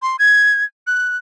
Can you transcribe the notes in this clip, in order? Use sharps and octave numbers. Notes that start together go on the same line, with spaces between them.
C6
G#6
F#6